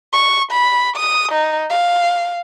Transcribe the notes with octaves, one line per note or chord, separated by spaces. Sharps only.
C#6
B5
D#6
D#4
F5